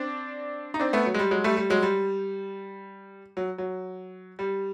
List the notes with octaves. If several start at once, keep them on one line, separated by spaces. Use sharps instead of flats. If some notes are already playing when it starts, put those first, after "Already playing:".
Already playing: C4 D4
D#4
C4 D4
A3 B3
F#3
G#3
G3
F#3 G#3
G3 A3
G3
F#3 G#3
G3
F#3
F#3
G3